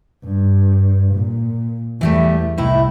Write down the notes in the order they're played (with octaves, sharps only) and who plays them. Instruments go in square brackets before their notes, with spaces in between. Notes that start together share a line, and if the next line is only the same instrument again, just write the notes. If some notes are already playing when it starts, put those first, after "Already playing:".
[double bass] G2
A#2
[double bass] E2 [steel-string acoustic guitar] E3 G3 A3
[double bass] C2 [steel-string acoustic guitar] A2 D#4 E4